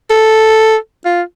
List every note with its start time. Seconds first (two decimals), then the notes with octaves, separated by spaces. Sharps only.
0.10 A4
1.05 F4